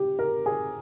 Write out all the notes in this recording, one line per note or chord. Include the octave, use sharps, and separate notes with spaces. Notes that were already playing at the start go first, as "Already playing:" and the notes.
Already playing: G4
A#4
G#4